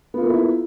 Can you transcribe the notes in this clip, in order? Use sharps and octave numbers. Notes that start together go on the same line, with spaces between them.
A#3 B3 E4 F4 A4